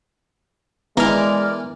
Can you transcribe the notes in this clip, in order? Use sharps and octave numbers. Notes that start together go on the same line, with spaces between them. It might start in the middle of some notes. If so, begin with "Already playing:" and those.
E3 G#3 B3 D4 E4 A#4 D5 F6